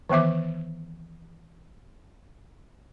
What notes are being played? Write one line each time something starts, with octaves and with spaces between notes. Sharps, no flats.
D#3 E3 B3 E5 D6